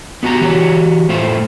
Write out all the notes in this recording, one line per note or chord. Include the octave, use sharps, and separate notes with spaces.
B3 F#4 G4 A#5
E3 F#4 G4 C#5
A2 A3 F4 C5